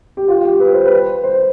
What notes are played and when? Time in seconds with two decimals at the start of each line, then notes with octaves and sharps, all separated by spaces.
0.17 G4
0.28 F4
0.45 G4
0.60 B4
0.73 C5
0.86 B4
1.24 C5